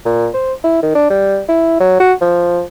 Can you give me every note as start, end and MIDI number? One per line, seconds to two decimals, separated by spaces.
0.05 0.28 46
0.34 0.53 72
0.64 0.80 64
0.83 0.91 51
0.95 1.09 62
1.10 1.41 55
1.48 1.77 64
1.80 1.98 54
2.00 2.13 66
2.21 2.62 53